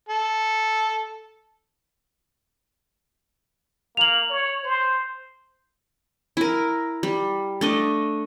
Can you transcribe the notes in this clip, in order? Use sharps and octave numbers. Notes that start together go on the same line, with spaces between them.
A4
A#3 F7 F#7
C#5
C5
E4 A#4
G3
A3 D4 D#5